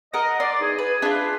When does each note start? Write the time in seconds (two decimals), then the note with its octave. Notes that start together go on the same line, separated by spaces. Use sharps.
0.14 A#4 D#5 F#5
0.40 D5 C6
0.61 E2 D#4 G#4
0.78 G#4 B4
1.02 D4 F4 G#4 B4